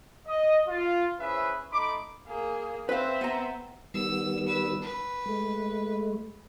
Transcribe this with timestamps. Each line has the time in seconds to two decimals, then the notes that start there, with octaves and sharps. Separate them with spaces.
0.26 D#5
0.68 F4
1.20 C#4 E4 G#4 B4 C5 E5
1.71 A3 D#4 B5 C6 D6
2.27 A#3 G#4
2.89 C4 B4 E5 F5
3.21 B3 A#5
3.94 D#3 G3 B3 E6
4.47 B4 E6
4.82 B4
5.26 G#3 A3